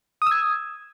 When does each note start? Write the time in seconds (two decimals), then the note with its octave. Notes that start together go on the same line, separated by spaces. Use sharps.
0.22 D#6
0.27 E6
0.31 G#6